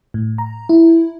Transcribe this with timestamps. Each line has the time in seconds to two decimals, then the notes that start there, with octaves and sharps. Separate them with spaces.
0.14 A2
0.38 A#5
0.69 E4